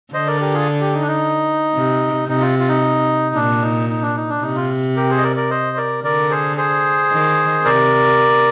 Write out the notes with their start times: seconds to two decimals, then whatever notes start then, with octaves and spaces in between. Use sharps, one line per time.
0.14 D3 C5 D#5
0.27 A#4 D5
0.41 G4 A#4
0.54 F4 G#4
0.80 G4
0.94 D#4
1.01 D4
1.07 D#4
1.74 C3
2.28 C3 D#4
2.41 F4
2.59 F4
2.68 D#4
3.35 A#2 D4
3.62 D#4
3.89 D#4
4.02 D4
4.16 D#4
4.29 D4
4.42 C3 D#4
4.56 F4
4.96 G4 A#4
5.10 G#4 C5
5.18 D#5
5.23 A#4 D5
5.36 A#4 D5
5.50 C5 D#5
5.77 A#4 D5
6.04 D3 A#4 D5
6.30 G#4 C5
6.57 G#4 C5
7.11 D#3
7.64 C3 A#4 D5